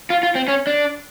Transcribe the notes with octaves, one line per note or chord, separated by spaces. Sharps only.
F4
F4
C4
C#4
D4